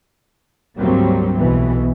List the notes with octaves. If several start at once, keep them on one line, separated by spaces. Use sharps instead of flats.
D2 G#2 F#3 G3 A#3 C4
B1 B2 E3 B3